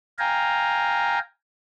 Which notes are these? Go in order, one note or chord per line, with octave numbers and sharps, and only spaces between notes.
F5 G5 G#5 A#5